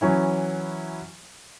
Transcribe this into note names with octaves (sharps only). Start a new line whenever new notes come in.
E3 F#3 C#4 E4